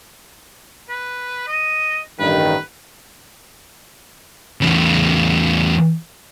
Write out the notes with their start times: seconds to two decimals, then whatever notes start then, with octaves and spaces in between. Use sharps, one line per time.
0.89 B4
1.47 D#5
2.19 A1 G2 D#3 B4
4.62 E2 C#3